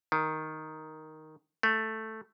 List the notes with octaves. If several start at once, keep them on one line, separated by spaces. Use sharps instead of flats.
D#3
A3